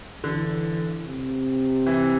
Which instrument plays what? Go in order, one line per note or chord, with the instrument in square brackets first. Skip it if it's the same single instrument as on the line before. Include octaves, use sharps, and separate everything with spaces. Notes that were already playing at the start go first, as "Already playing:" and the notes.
[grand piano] D3 [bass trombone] E3
[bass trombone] C3
[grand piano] E3